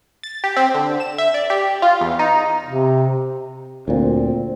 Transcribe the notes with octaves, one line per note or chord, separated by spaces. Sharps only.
A6
G4
C4
D3
E7
E5
D5
G4
F4
E2
D#4
C3
D2 A#2 C4